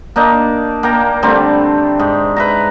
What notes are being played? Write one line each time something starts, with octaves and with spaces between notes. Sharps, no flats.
A#3 D4 D#4
A#3 G5 A#5
D3 G3 A3 C4
G#2
B4 E5 A#5